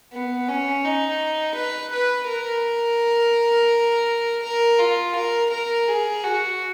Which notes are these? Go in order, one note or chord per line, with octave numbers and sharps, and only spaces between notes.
B3
C#4
D#4
B4
B4
A#4
A#4
F4
A#4
A#4
G#4
F#4